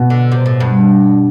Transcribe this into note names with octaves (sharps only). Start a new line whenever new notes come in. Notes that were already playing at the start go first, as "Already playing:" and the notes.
Already playing: B2
D3
C3
A2
G2